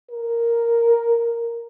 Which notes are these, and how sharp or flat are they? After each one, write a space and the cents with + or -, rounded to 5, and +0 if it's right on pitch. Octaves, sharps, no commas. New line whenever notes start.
A#4 +0